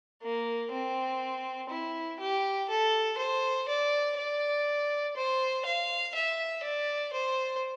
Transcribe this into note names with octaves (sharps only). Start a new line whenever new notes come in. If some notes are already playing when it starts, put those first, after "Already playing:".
A#3
C4
E4
G4
A4
C5
D5
D5
C5
F5
E5
D5
C5